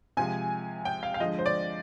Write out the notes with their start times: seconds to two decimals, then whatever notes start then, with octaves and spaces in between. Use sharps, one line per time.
0.17 C3 F3 G#3 G#5
0.85 G5
1.03 F5
1.14 F5
1.20 D3 F3 G#3 D#5
1.39 C5
1.46 D5